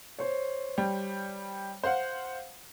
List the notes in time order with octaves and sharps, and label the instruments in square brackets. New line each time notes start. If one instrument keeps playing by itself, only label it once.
[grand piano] C5 C#5
[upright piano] G3
C5 F5 F#5